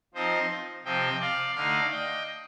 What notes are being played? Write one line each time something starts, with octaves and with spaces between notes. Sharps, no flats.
F3 C4 D#4 C5 D#5
C3 F3 C4 D#5 G5
D5 F5
D3 A3 D#4 D5 F5
D#5 G5